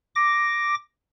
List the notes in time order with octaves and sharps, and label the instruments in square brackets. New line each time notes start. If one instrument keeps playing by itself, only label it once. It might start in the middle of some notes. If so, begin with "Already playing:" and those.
[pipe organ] D6 A#6